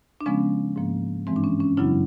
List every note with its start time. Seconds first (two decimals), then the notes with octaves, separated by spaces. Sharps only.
0.21 D4
0.26 C#3 F3 G#3 B3 C#4
0.76 G#2 F3 A#3
1.27 G2 E3 G#3 C4
1.36 D4
1.44 C#4
1.60 C#4
1.77 F#2 C#3 F#3 B3 D4 E4